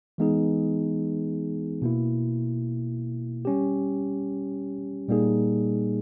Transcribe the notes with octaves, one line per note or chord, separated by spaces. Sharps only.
E3 G#3 B3 D#4 G#4
B2 A#3 E4
G3 C#4 G4
A#2 G3 A#3 D#4 G#4